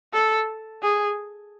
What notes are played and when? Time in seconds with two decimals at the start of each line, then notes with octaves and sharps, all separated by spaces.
0.13 A4
0.82 G#4